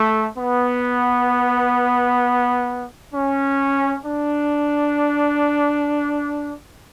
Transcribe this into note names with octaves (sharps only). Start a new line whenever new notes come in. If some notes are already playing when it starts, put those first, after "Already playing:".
Already playing: A3
B3
C#4
D4